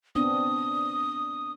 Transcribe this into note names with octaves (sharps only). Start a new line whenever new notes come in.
B3 C4 D4 D#6